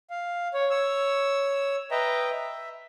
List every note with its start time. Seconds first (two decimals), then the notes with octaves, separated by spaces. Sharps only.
0.10 F5
0.54 C#5
0.70 C#5 E6
1.91 B4 D#5 E5 G5 A#5
2.30 E5